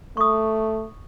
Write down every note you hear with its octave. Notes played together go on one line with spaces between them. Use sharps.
A3 C#6 D#6